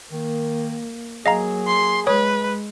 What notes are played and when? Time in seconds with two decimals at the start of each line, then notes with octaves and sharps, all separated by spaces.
0.12 D#3 A#3
1.26 F#3 A#3 G#4 D#5 F5 A#5
1.67 C6
2.07 G#3 B4 C#5 D#6